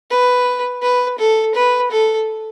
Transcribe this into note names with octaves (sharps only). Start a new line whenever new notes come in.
B4
B4
A4
B4
A4